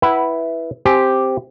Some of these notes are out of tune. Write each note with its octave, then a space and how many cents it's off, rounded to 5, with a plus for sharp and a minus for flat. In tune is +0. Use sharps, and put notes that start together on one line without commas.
E4 +0 B4 -5 F#5 +30
C4 +0 G4 +0 G#5 +15